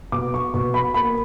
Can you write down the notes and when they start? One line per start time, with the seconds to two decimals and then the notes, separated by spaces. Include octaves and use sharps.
0.12 B2 D6
0.34 C#6
0.54 B2 C#6
0.74 B5
0.94 A#3 B5